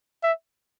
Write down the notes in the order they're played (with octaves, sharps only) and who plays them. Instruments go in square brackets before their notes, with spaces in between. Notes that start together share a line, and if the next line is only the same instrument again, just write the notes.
[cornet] E5